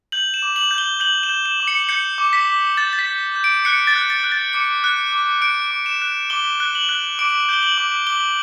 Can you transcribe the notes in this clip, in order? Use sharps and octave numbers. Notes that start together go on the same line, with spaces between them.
G6 F#7
E7
D6
F#7
G6
G7
G6 F#7
E7
G6
E7
D6
C#7
G6 C#7
D6
B6
D6
G6 A6
A6
B6
G6
G6
D7
F#6 C#7
A6
F#6
A6
F#6
A6
D6 C#7
F#6
D6
F#6 D7
D6
E7
F#6
D6 G7
F#6
F#7
F#6
D6 D7
G6 G7
F#7
D6
D6 G7